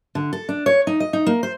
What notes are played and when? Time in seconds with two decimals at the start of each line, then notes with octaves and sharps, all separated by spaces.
0.15 D3
0.33 A4
0.49 D4
0.66 C#5
0.87 D#4
1.00 D#5
1.13 D#4
1.27 A#3
1.43 C5